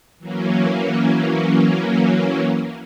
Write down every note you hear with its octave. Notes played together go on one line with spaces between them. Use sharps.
E3 F#3 A#3 C#4